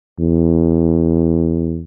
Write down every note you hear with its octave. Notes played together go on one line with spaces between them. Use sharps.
E2